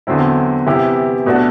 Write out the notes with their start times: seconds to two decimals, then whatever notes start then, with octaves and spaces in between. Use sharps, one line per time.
0.07 E2 D3 F#3 C4 E4
0.66 C3 E3 B3 E4 G4
1.26 B2 A3 D4 F#4 A4